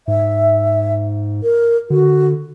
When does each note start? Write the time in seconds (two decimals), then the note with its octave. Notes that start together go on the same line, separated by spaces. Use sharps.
0.08 G#2 E5
1.43 A#4
1.90 D3 F#4